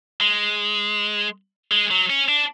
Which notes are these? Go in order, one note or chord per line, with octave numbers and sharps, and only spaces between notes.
G#3
G#3
F#3
C#4
D4